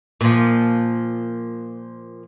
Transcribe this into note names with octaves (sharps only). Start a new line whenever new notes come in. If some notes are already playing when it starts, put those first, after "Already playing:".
A#2 F3